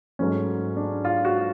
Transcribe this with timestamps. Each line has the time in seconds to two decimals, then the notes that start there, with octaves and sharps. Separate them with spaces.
0.19 G#2 F#3 A3 C#4
0.76 D4
1.05 F4
1.25 F#4